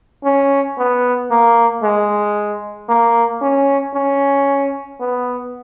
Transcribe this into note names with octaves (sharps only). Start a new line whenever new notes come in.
C#4
B3
A#3
G#3
A#3
C#4
C#4
B3